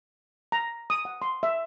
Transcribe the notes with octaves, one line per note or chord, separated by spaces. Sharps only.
A#5
D#6
F#5
C6
E5